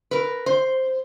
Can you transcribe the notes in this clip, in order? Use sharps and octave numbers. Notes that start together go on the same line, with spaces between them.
A#4 B4
C5